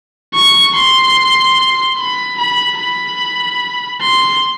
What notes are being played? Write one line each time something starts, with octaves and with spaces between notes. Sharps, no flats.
C#6
C6
B5
B5
B5
C6